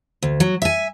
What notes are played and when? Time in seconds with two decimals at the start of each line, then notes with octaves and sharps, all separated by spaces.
0.22 D2
0.40 F#3
0.62 E5 G#5